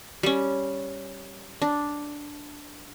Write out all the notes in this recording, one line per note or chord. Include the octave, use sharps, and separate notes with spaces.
G3 C#4
D4